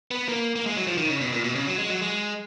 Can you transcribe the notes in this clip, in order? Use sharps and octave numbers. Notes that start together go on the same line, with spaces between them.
B3
A#3
A#3
G#3
F#3
F3
D#3
C#3
B2
A#2
B2
C#3
F#3
G#3
F#3
G#3